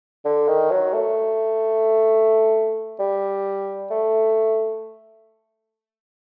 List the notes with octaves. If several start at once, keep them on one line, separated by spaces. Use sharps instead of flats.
D3
D#3
F#3
A3
G3
A3